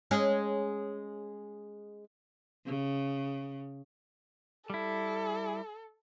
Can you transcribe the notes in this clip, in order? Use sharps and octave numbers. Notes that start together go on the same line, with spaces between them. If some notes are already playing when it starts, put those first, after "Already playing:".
G#3 C#4 G#4
C#3
G3 E4 A4